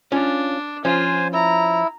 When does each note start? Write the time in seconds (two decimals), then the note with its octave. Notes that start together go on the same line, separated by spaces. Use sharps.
0.12 C#4 D4 F4
0.85 F3 C#4 F4 C5 G#5
1.33 E4 A#5